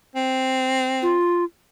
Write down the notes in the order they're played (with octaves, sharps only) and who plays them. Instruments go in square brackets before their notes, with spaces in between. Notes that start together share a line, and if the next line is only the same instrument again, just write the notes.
[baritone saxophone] C4
[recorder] F4